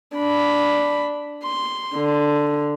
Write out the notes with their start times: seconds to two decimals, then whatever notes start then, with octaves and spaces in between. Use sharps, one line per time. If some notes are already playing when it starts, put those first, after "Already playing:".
0.17 D4 B5
1.44 C6
1.96 D3